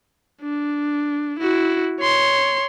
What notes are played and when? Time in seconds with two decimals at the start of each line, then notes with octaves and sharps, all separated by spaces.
0.42 D4
1.40 E4 F#4
2.00 C#5 C6